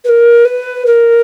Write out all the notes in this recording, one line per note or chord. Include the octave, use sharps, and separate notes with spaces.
B4
A#4
B4
A#4